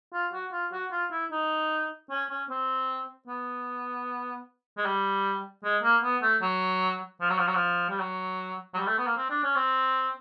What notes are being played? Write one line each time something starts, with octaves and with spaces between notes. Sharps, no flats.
F4
F#4
F4
F#4
F4
E4
D#4
C#4
C#4
C4
B3
G#3
G3
G#3
A#3
B3
A3
F#3
F3
F#3
F3
F#3
F3
G3
F#3
F#3
G3
A3
B3
A#3
C4
D4
C#4
C4